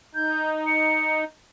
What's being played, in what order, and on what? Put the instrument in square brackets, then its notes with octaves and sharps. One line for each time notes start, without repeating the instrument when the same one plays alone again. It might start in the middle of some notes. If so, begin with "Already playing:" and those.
[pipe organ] D#4 [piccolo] G6
[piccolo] C#7